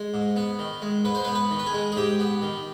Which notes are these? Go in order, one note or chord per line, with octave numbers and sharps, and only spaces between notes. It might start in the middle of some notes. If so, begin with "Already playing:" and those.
Already playing: G#3
G#2
B3
D#3
G#3
G#2 B4
C5
B4
B3
B4
D#3
B4
G#4
G#3
G#4
G#2 G4
B3
D#3